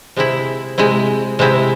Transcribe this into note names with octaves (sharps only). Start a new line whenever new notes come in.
C3 G#3 C4 E4
C3 G#3 C4 E4
C3 G#3 C4 E4